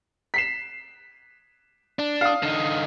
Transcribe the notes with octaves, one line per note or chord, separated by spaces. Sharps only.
B6 C7 E7
D4
F5 D#6
D3 D#4